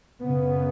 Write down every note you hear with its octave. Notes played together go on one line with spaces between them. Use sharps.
F#2 C#3 B3